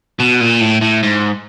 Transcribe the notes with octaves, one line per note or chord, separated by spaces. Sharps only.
B2
A#2
A2
A2
G#2